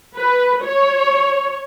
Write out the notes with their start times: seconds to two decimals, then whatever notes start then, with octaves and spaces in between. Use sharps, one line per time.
0.17 B4
0.63 C#5